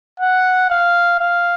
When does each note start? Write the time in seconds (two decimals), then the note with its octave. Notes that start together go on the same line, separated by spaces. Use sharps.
0.20 F#5
0.71 F5
1.20 F5